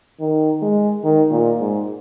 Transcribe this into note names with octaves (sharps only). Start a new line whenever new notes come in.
D#3
G#3
D#3
A#2
G#2